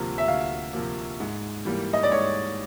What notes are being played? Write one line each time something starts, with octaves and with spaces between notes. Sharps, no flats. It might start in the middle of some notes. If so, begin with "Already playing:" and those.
Already playing: D2 C3 F3 A#3
E5
D2 F5
C3 F3 A#3
G#2
E3 G3 A#3
D#5
D5
G#2 C#5